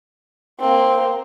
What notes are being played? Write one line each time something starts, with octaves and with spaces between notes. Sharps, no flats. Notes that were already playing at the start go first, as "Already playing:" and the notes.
A#3 C4